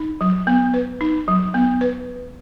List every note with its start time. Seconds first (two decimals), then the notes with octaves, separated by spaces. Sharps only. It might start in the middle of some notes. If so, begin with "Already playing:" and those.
Already playing: D#4
0.21 F#3
0.47 B3
0.74 B4
1.01 D#4
1.28 F#3
1.54 B3
1.81 B4